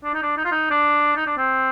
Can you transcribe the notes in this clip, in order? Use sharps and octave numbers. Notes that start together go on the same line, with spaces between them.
D4
D#4
D4
D#4
F4
D#4
D4
D#4
D4
C4